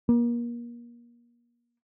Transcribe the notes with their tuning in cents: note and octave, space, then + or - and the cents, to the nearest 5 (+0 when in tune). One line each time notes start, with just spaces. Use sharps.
A#3 +35